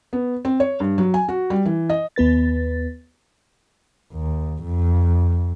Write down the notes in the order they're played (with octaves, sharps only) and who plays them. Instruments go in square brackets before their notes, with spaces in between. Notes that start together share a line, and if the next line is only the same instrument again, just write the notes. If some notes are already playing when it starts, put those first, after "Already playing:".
[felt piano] B3
C4
C#5
G2
F#3
G#5
F#4
G3
E3
D#5
[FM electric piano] D#2 B3 B4 A6
[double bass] D#2
F2